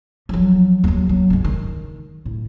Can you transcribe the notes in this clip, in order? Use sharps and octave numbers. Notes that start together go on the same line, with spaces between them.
F3 F#3
D#2 F#3
F#3
G#2 G#3
D#3
A2